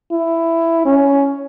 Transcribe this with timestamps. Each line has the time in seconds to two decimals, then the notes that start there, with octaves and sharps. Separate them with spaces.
0.12 E4
0.85 C#4